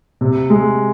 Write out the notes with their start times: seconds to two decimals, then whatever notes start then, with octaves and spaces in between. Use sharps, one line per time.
0.21 C3
0.50 G#3